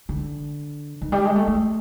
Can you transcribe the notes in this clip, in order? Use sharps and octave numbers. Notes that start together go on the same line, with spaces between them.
D3
D#3
G3
G#3
A3
A3